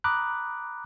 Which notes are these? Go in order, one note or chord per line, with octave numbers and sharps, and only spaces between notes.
A#5 B5 D6 D#6 F#6